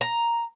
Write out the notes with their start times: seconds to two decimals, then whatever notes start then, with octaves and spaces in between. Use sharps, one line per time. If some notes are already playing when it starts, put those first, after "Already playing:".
0.01 A#5